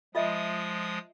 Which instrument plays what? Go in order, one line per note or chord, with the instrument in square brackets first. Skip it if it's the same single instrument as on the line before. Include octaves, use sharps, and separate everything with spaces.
[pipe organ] F3 G#3 D#6 [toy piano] F4 D#5 E5